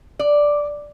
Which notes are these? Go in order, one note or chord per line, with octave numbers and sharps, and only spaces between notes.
D5